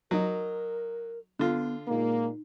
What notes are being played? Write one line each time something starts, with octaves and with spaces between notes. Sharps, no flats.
F#3 D#4 A#4
D3 B3 F4
A#2 G#3 A#3 D#4